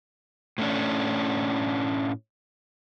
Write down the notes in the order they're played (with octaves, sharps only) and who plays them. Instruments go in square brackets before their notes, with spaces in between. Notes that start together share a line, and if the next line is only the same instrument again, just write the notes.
[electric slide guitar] A2 A3 C#4 D4